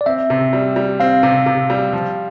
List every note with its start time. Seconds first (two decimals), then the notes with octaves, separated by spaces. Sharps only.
0.01 D5
0.06 C4 E5
0.30 C3
0.53 G3
0.76 G3
1.00 C4 F5
1.23 C3
1.46 C3
1.70 G3
1.93 F3